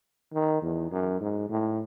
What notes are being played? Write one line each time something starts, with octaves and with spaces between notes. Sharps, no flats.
D#3
E2
F#2
G#2
A2